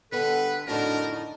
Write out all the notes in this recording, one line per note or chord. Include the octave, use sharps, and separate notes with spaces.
D3 G3 B3 A4 B4
F2 A2 D3 A3 D4 D#4 F#4 A#4